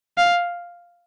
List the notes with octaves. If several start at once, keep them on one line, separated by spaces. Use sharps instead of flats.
F5